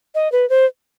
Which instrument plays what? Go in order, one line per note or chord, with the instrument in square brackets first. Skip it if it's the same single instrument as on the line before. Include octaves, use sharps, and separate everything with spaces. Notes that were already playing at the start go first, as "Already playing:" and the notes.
[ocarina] D#5
B4
C5